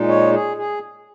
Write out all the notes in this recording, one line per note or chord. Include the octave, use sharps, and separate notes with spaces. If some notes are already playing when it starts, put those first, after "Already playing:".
Already playing: A#2 G#3 D#4
C#5
G#4
G#4